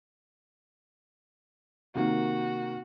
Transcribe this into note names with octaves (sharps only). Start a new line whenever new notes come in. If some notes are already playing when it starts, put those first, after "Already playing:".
C3 D#3 A#3 F#4